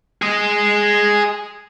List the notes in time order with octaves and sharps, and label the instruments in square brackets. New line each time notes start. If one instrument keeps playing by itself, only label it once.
[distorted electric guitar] G#4 D#5